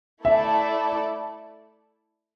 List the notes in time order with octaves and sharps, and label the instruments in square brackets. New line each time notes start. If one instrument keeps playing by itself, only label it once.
[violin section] A3 E4 A4 D5 [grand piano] E5